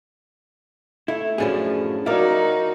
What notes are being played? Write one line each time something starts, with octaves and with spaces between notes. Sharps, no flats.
A3 E4
F#2 A2 F3 C#4 D4 G#4
F#3 D#4 E4 F#4 A#4 D5 F5